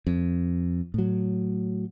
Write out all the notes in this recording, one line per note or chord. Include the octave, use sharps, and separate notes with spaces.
F2
A2 F#3